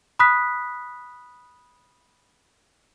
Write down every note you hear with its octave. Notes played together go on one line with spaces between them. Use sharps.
B5 D#6 F#6 B6